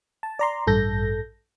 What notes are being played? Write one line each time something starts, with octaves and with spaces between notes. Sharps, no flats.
A5
D5 A#5 C6
A1 G2 A4 G6 A#6